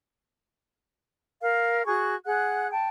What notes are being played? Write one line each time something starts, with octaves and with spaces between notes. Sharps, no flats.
A#4 F5
F#4 G#4 C#6 F#6
G#4 F#5 F#6
G5 A5